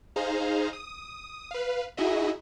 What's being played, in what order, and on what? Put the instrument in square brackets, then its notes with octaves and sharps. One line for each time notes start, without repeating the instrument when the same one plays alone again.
[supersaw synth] D#4 G#4 C5 F5 A#5
D#6
B4 F5
D#4 E4 F#4 G#4 D#5 E5